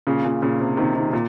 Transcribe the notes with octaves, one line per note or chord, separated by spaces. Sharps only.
A#2 C#3
A#2 C#3
A#2 C#3
C3
C3 D#3
C3 D#3
A#2